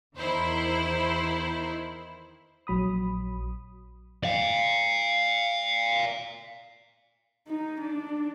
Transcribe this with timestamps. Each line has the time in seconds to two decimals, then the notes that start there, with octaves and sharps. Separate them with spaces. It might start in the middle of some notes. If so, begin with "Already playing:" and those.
0.17 E2 D#3 E4 C5
2.67 A#1 F#3 B5 D#6
4.24 D5 F5
7.47 D#4
7.81 D4